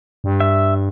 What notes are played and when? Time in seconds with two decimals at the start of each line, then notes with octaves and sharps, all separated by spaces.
0.24 G2
0.40 E5